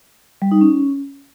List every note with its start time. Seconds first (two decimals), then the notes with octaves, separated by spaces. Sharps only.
0.42 G3
0.51 D#4
0.61 C#4